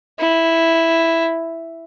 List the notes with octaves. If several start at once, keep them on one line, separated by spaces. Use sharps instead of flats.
E4